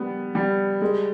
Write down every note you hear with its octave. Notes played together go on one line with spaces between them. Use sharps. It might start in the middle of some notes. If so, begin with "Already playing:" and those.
Already playing: G3 B3
G3
G#3